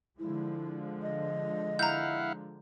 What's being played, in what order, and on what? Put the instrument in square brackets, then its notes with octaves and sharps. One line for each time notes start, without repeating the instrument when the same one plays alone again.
[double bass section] D3 F3 G#3 [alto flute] E4
[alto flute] D#5
[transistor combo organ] E4 F5 F#5 [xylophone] A#5 G6